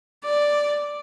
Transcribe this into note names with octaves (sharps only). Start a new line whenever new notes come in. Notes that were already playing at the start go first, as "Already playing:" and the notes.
D5